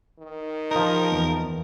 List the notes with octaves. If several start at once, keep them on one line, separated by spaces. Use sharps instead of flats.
D#3
F3 D#4 A#4
E2 B3